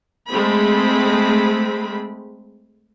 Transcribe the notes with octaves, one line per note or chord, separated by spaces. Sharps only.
G#3 A3 C4 B5